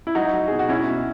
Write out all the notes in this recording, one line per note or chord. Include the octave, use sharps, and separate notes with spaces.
E4
F#3 D#4 F#4
F#3
B2 G#4
F#4
B2 C#4 E4
B2